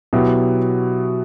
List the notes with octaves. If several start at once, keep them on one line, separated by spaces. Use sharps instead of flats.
B2 F#3 B3 E4 G4